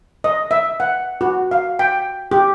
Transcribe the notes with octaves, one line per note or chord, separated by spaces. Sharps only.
D#5
E5
F#5
F#4
F5
G5
G4